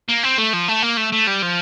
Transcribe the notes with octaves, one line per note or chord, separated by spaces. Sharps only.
A#3
C4
A3
F3
A3
A#3
A3
A3
G3
F3